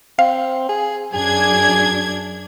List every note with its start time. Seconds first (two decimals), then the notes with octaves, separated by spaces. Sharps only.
0.19 C4 F5
0.69 G#4
1.14 F#2 D4 G#4 G#6